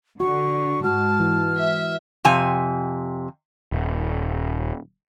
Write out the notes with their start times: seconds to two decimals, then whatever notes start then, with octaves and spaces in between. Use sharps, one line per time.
0.20 D3 F#4 C#6
0.84 G#2 G#3 F#4 A5 F6
1.20 E3
1.57 E5
2.25 F2 C3 G#5
3.72 D#1